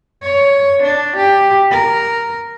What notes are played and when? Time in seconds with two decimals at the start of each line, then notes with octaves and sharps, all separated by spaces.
0.23 C#5
0.83 D4
1.17 G4
1.71 A#4